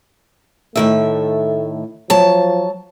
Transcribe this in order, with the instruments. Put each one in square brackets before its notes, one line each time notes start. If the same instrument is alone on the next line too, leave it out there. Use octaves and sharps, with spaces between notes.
[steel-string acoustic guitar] A2 D#3 E5 [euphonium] A3
[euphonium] F3 [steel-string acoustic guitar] F#3 A5